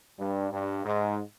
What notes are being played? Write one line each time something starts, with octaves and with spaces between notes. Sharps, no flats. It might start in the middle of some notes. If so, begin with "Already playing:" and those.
G2
G2
G#2